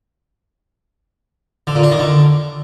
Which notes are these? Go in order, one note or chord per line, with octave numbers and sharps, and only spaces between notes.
D3
A#2
D4
D#3
D3